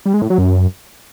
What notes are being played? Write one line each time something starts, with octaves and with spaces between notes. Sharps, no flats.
G3
G#3
A2
F#3
F#2